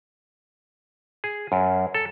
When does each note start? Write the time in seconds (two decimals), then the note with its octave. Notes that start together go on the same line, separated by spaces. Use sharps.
1.24 G#4
1.52 F#2
1.94 A4